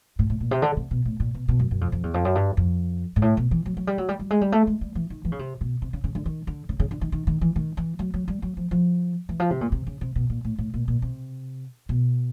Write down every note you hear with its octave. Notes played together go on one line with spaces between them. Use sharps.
A2
A2
A#2
C3
D3
C3
B2
A2
A#2
B2
B2
F#2
F#2
F2
F2
E2
F2
F#2
G2
F2
G#2
A2
B2
E3
F#3
F#3
G3
F#3
G3
G3
G#3
G3
A3
G#3
G3
E3
D#3
E3
C#3
C3
B2
C3
C#3
C#3
D3
D#3
D3
C#3
C#3
D3
D#3
D#3
D#3
E3
D#3
E3
F#3
F#3
G3
F#3
F3
F3
E3
F3
C3
A#2
C3
C#3
C3
B2
A#2
A2
A2
A#2
A#2
C3
B2